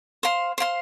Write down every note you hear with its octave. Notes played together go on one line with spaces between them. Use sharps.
C5 F5 C6
C5 F5 C6